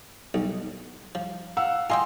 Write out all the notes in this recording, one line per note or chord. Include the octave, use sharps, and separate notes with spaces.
B1
F3
F5 F#5 E6
F4 D#5 G5 G#5 C6